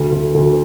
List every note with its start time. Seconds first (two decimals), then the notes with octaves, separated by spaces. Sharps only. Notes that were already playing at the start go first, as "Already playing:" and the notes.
Already playing: D2
0.12 D2
0.34 D2